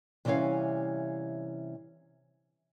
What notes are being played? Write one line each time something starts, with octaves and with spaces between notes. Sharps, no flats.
C3 E3 G3 C#4 C#5 F5